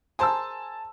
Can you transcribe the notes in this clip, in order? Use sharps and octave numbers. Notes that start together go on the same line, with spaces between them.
G#4 A#4 C5 G#5 A5 E6